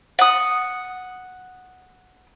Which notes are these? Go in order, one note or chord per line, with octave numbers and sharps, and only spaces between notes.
F#5 D#6